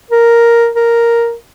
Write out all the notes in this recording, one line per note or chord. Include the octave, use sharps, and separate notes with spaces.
A#4
A#4